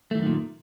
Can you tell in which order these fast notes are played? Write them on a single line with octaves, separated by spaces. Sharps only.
A3 E3 F#2 D#3 A#2